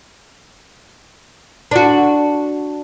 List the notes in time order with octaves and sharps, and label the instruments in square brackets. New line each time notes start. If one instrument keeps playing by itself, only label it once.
[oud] D4 F#4